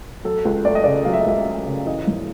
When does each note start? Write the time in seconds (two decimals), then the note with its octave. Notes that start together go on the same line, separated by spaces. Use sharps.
0.25 F#3 A4
0.45 C#2
0.65 A3 D5
0.75 D#5
0.84 C#3 D5
1.05 F#3 F5
1.13 E5
1.20 D#5
1.26 C#2 E5
1.46 A3
1.66 C#3
1.86 E3 D#5
2.07 G#1